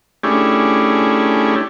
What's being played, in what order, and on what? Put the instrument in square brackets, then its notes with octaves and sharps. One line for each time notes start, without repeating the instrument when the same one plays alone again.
[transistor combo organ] A3 C#4 D4 E4 G4 G#4